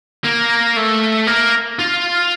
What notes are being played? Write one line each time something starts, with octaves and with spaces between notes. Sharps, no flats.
A#3
A3
A#3
F4